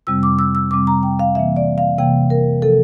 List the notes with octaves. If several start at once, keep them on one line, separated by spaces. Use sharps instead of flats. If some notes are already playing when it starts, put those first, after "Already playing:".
F2 C3 G3 C4 E6
D6
E6
E6
F2 C3 G3 C4 D6
A#5
G5
F5
C3 E3 A#3 E5
D5
F5
C3 E3 A#3 G5
A#4
C3 F3 A4